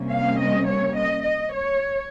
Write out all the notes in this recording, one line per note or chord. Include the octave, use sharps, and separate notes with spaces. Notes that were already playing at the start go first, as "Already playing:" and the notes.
Already playing: C3 G3 A#3 C#4
F5
D#5
C#5
D#5
D#5
C#5